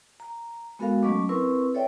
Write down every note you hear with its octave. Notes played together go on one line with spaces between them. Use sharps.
A#5
G#3 B3 F#4 A4 A#4 F5
F#3 A3 C#4 D#5 C#6 D6
C4 E4 A#4 B4 C#6
A4 C#5 D5 E5 G5